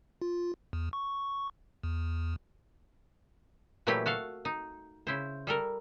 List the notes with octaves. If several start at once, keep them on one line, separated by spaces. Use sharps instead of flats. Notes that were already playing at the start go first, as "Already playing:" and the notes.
F4
E2
C#6
E2
A#2 E3 F#3 A3 E4 G4
F#4 A4 F5
D#4
C#3 E4 C5
G3 A4 A#4